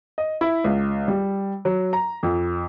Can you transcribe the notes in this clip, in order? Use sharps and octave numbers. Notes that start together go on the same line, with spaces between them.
D#5
E4
C#2
G3
F#3
A#5
F2